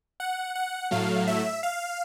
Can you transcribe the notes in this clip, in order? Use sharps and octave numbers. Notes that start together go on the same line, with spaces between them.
F#5
F#5
A2 F#3 A3 F5
E5
F5